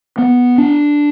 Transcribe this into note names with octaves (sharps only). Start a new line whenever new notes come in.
B3
D4